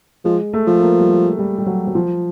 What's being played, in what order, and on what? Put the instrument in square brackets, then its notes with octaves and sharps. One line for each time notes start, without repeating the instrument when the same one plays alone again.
[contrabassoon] F3 [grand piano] G#3
[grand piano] A3
[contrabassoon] F3
[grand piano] A#3
G3
G#3
G3
G3
F#3
F#3
F3